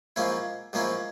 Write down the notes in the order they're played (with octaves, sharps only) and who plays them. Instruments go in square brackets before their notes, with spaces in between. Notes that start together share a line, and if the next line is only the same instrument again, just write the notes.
[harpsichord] G#2 F3 A#3 C#4 E4
G#2 F3 A#3 C#4 E4